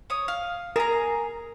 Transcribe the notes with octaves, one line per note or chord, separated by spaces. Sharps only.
C#5 D#6
F5
G#4 A#4 A#5